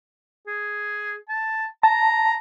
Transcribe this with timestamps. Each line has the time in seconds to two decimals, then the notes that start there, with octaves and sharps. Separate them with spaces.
0.47 G#4
1.29 A5
1.83 A5 A#5